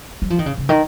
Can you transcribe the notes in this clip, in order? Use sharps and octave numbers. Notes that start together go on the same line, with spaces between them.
F#3
F3
D#3
C#3
C#3
D#3